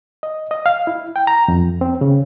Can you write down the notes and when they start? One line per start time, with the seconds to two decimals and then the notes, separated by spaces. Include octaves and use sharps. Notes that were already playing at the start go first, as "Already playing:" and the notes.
0.23 D#5
0.51 D#5
0.66 F5
0.87 E4
1.16 G5
1.27 A#5
1.48 F2
1.81 C4
2.01 C#3